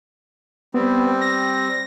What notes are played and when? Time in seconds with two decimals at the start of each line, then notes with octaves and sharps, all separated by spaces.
0.74 G3 B3 C4
1.21 A#6